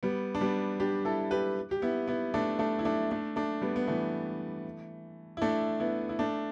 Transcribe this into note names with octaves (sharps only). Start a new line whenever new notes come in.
G3 B3
D4
G3 B3
D4 G4
E4 A4
G4 B4
G4
B3 E4
B3 E4
A3 D4
A3 D4
E4
A3 D4
A3 D4
A3 D4
G3 B3
B3
E3 A3
E4
A3 D4
B3 E4
E4
A3 D4